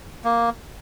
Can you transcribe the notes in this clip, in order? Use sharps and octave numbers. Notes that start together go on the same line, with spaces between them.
A#3